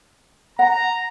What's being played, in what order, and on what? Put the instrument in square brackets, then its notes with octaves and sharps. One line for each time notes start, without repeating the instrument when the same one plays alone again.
[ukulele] F#5 [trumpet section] A#5